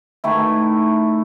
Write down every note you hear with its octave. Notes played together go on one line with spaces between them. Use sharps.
D#3 A3 E4